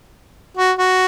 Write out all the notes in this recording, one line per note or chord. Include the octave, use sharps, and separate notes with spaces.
F#4
F#4